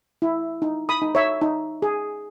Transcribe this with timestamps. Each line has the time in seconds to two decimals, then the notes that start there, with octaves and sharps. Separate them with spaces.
0.22 E4
0.62 D#4
0.89 B5 D#6
1.02 D#4
1.15 C#5 E5
1.41 D#4
1.82 G#4